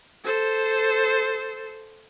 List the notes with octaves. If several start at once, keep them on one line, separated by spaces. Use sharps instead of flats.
A4 C5